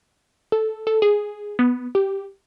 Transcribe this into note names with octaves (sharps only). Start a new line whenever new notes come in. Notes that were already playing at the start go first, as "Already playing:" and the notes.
A4
A4
G#4
B3
G4